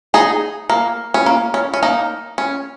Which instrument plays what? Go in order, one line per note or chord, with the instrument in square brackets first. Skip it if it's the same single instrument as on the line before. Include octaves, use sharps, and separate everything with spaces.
[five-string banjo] D#4 G#4
A#3
C#4
A#3
C#4
C#4
A#3 D#4
C#4